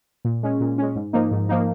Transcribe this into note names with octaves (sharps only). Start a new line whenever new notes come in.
A#2
G#3 C#4
A#2
G#3 C#4
G#2
F3 A#3 D#4
G#2
F3 A#3 D#4